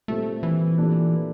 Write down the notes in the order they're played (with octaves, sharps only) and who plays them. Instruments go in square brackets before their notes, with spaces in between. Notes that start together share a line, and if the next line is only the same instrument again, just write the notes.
[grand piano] A#2 G3 C4 G4 [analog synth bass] A3
[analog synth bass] E3
[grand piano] A#2 A3 D4 G4